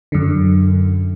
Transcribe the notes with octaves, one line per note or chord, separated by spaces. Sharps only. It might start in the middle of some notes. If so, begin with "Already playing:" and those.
F#2 D3